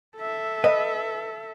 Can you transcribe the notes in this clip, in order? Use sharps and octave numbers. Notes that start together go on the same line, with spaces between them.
A4 E5
B4 D#5